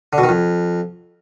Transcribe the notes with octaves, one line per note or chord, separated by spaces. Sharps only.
D3
B2
D#3
F2